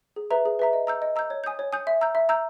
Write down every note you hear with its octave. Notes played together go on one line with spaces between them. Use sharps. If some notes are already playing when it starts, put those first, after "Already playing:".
G#4
B4 E5 A#5
G#4
B4 E5 A#5
D#5
A#5 E6 G6
D#5
A#5 E6 G6
C#5
G#5 D#6 G6
C#5
G#5 D#6 G6
E5
A#5 E6 G6
E5
A#5 E6 G6